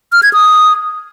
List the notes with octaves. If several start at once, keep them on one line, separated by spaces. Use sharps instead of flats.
F6
G#6
D#6